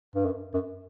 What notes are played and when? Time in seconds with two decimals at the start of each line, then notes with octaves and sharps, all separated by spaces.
0.15 G2
0.25 F#2
0.54 F#2